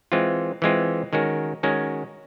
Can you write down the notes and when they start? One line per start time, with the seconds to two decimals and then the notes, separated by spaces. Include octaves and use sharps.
0.12 E3 G#3 C4 F4
0.62 E3 G#3 C4 F4
1.13 D#3 G#3 C#4 F#4 A#4
1.63 D#3 G#3 C#4 F#4 A#4